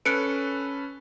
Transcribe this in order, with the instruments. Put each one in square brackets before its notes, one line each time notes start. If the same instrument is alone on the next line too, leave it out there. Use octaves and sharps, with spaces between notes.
[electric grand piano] C#4 A4 B4 [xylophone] F#6 C#7 D7